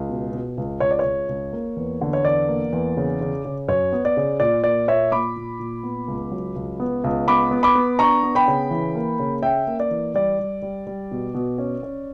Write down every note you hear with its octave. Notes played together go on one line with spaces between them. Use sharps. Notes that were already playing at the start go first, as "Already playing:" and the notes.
Already playing: C#2
B2
B2
C#2
C#2 C#5
D5
C#5
C#2
C#2
A#3
E2
D3
C#5
E2 D5
A#3
E2
C#3
C#3
C#3
F#2 C#5
B3
D5
C#3
A#2 D5
A#3 D5
A#2 C#5 E5
A#2 B5 D6
A#2
A#2
B3
C#2
F#3
C#2
B3
C#2
B3 B5 D6
B3
B5 D6
B3
D4 A#5 C#6
B3
G5 B5
C#3
E3
A#3
C#3
C#4 E5 G5
A#3
D5
E3
G3 D5
G3
G3
G3
B2
B2
C#4
C#4